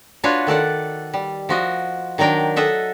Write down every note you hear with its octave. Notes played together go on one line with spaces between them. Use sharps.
D4 F4 F#4 B4 C#5
D#3 A4 D5 F#5
G3
F3 F#4 D#5
D#3 F#3 D4 A#4 G5
A4 D#5 E5 F#5